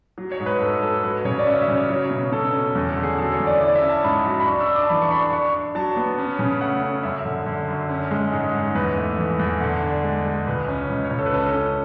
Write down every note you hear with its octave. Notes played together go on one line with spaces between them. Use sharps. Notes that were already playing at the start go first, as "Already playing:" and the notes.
F#3
C#5
G#2
B4
G#2 A4
G#2 A4
F#3 B4
C#3 C#5
D5
C#4 E5
E5
C#3
C#5
F#3 C#5
B2
B2 A4
C#4
E2
A4
D3
G#4
F#3 A4
C#5
E2
D5
E4 D5
E5
C#4
A5
G#2 B5
F#3
B5
D4 C#6
E6
D4
D6
A5
E3 B5
C#6
D4 B5
D4 C#6
D4
F#3 A5
B3
C#4
C#3
A3 F#5
C#4
F#2 E5
D3
D3
F#2
C#4
G#3
G#2
G#2
E2 B4
A3
E3
E2
D3
D4
G#3
G#3
C#2 B4
C#4
C#2
C#5
C#2
A4
B4
C#4 A4
C#4